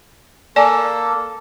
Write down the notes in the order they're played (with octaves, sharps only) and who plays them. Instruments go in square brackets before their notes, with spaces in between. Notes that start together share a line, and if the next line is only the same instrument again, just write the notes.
[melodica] A#3 A4 [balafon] D5 G#5